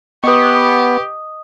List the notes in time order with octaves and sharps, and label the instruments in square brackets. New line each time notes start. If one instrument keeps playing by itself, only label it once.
[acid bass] B3 [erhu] G4 [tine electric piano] B4 C#6 [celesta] D#5 D#6